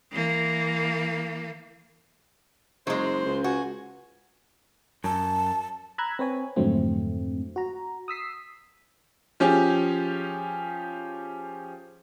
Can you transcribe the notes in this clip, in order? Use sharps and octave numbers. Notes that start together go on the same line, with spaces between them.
E3 A#3
F#1 F#3 G#3 C5
C#2
F#4 G#5
F#2 A5
A#5 B5 E6 F#6 G#6
C4 B4 C#5 G#5
F2 G#2 D3 F#3 A3 C4
F#4 A#5
D#6 E6 B6 C7
F3 C#4 G4 G#4